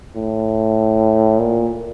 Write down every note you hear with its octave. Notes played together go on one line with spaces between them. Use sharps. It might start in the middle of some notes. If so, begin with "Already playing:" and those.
A2
A#2